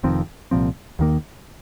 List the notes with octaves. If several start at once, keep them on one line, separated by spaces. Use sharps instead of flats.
F1 F2 D#3 C4
C2 A#2 F3 C4
D#2 D#3 A#3